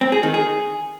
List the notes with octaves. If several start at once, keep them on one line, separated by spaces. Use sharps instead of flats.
C4
G#4
D#3
G#4